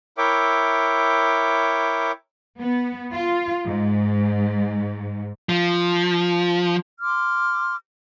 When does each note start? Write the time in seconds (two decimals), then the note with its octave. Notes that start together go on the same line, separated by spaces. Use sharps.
0.18 E4 A#4 C#5 E5 G5 D6
2.59 B3
3.13 F4
3.65 G#2
5.49 F3
7.01 C6 D6 F6